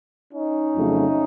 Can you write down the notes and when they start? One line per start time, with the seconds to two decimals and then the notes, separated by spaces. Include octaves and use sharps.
0.33 C#4 D#4
0.76 F2 C#3 F#3 A3